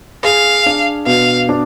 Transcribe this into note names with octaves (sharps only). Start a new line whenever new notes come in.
G#4 F5
D4
B2 F5
D4